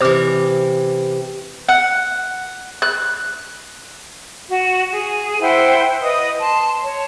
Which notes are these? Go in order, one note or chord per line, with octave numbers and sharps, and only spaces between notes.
C3 E3 C5 D6 F6
F#5
F#6
F#4
G#4
E4 C5 F#5 G5
B4 D#5 D#6
A5 C6
C#5